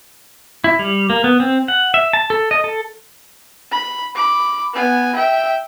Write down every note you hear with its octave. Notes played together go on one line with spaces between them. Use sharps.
E4
G3
A#3
B3
C4
F#5
E5
A5
A4
D#5
A4
B5
B5 D6
B3 G#5
E5 G5